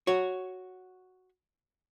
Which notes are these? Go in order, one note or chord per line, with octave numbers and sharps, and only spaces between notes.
F#4 C#5